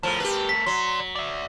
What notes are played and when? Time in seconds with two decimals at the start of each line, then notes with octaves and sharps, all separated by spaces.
0.03 A2 F3 A3 A#4
0.20 G4 B4
0.49 B6
0.66 F#3 D5 C6
1.15 D5 E5